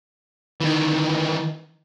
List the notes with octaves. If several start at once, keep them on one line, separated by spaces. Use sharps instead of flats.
D#3 E3